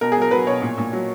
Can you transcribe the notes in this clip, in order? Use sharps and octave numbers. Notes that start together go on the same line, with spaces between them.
B2 A#4
G#4
F#3 A#4
F#3 B4
B2 C#5
A#2
A#2
F#3